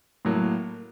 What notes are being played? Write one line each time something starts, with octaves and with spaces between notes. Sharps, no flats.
A2 F#3 A#3